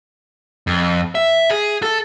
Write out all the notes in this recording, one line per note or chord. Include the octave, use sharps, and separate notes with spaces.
F2
E5
G#4
A4